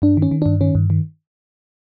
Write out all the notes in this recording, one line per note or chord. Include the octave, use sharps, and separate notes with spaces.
G2 D4
D#3
C#4
D#3
G2 D4
D#3 C#4
G2
D#3